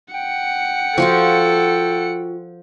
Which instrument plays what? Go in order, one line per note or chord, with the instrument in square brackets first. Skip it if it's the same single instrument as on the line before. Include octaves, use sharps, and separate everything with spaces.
[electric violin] F#5 C#7 [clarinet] G5
[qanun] F3 F4 F#4 [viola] A4